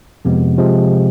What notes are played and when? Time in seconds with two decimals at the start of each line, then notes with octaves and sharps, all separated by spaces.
0.25 F2 C3 F3 G#3 B3
0.57 C3 F3 G#3